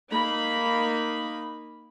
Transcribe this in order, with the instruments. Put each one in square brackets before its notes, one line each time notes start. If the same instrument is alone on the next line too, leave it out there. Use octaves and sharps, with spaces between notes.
[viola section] A#3 D#4 B5